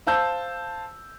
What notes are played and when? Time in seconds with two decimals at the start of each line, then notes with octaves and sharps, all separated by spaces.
0.07 C5 F5 A5 E6 G6